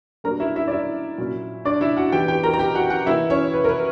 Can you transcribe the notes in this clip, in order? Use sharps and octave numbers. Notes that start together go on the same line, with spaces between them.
B2 G3 A#3 D4 A#4 A#5
E4 E5
E4 E5
D5
E4 E5
A#2 F#3 C#4
D4 D5
E4 E5
F#4 F#5
E3 B3 E4 G4 G5
G4 G5
A#4 A#5
A#5
G4 G5
F#4 F#5
F#4 F#5
E3 A#3 E4 E5
C#4 C#5
B4
A#4
B4